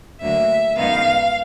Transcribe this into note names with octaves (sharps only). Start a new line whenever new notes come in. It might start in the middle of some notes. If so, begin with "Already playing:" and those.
D2 D3 F#3 A#3 E5
F#2 D#3 G#3 B3 D#4 F5